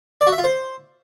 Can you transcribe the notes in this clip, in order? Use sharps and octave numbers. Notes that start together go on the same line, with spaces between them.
D5
F#4
E5
F4
C5